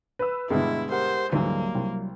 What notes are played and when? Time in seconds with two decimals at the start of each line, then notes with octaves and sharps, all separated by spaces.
0.19 B4 E6
0.51 G2 B2 D3 G#3 E4
0.91 G4 A#4 C5 F#5
1.32 D2 G#2 E3 F#3 G3 A#3
1.75 C2